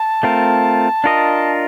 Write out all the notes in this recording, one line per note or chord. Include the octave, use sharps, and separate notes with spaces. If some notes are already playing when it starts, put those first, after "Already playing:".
Already playing: A5
A3 C4 F4 A#4
D4 F4 A#4 D#5